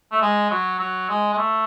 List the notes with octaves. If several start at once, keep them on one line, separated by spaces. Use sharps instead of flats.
A3
G#3
F#3
F#3
G#3
G#3
A3